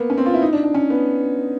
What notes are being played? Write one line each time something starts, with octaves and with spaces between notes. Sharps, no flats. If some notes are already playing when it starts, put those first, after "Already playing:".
Already playing: A#3 B3
C#4
C4
F4
E4
D#4
D4
D4
C#4
B3